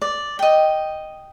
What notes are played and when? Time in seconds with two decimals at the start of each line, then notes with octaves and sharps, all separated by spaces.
0.02 D5
0.39 D#5 G5